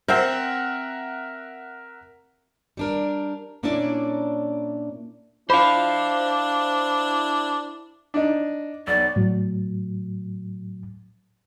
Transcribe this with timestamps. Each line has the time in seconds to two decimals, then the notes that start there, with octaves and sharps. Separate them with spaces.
0.08 C4 A#4 C5 E5 F#5
2.77 G3 D4 A#4
3.63 A#2 A#3 C#4 D4 E4 D5
5.50 D4 E4 F4 C5 F5
8.14 D4 D#4
8.87 B1 D5
9.16 A2 F#3